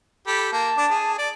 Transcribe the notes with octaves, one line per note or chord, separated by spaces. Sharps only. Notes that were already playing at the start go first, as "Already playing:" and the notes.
G4 A4 B5
A#3 A5
D4 D6
G#4
D5